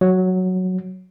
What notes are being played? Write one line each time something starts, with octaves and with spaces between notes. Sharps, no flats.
F#3